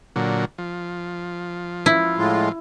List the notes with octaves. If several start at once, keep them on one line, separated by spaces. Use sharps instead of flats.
A#2 D3 F#3
F3
E4
A2 G#3 F4